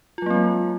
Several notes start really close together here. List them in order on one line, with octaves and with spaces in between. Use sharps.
F4 F#3 A#3 C4 G#3